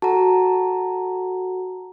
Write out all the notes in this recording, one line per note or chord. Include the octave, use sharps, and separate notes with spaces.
F#4 A4 F#5 A5 A#5